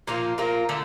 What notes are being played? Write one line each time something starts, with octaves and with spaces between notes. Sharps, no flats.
A#2 F3 A#3 F4
A#2 F3 A#3 F4
D3 A3